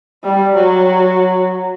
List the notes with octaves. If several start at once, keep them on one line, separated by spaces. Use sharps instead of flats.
G3
F#3